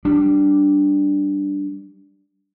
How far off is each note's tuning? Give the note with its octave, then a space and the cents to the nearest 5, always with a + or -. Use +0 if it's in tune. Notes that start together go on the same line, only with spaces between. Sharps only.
G3 -10 D4 +0